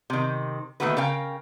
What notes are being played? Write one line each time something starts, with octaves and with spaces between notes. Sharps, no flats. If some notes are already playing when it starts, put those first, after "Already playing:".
C3 D#3
B2 D#3 A3 A#3 F#4 B4
C#3 A#4 F5 G5